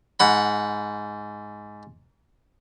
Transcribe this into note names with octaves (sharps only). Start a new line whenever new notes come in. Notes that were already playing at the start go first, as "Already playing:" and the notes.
G#2 F#5 B5